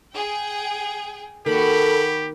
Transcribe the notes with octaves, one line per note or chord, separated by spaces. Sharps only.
G#4 G5
D#3 A#3 F#4 G4 A4 B5